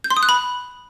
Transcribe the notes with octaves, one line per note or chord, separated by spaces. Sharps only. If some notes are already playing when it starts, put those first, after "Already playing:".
G6
C6
D#6
F#6
B5